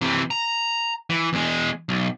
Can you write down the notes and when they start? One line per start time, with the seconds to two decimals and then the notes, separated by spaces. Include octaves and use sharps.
0.01 C3 E3
0.31 A#5
1.10 E3
1.33 E2 G#3
1.89 B1